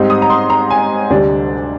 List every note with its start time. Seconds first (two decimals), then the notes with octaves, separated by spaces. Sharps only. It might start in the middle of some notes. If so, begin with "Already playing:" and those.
Already playing: G#2 G3 C4 D#4
0.10 D#6
0.22 A#5
0.30 C6
0.50 A#5
0.71 G#5
1.10 D2 C3 G3 D4